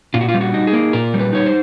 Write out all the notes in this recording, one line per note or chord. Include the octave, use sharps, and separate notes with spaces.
A#2 F4
F#4
F4
G3
F#4
D#4
G#4
A#3
A#2 A#4
G3
B4
D#4 C#5
C5